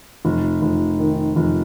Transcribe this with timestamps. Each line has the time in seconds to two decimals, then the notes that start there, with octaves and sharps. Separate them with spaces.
0.25 F1
0.62 F1
0.99 D#3
1.36 F1